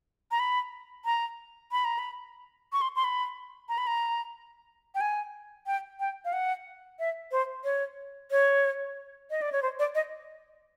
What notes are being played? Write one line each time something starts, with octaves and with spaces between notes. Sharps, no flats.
A#5
B5
A#5
B5
A#5
B5
C#6
C6
C6
B5
A#5
B5
A#5
G5
G#5
G5
G5
F5
F#5
E5
C5
C#5
C#5
D#5
D5
C#5
C5
D5
D#5